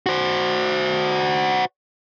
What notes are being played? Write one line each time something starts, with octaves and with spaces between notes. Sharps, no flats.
F#4 C5